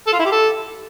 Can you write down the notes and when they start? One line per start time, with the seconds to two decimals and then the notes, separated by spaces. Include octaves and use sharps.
0.07 A4
0.13 F4
0.19 E4
0.25 G4
0.32 A4